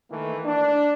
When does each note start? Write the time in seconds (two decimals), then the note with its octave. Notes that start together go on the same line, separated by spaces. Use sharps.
0.10 D#3 E3 A3 A#3
0.45 D4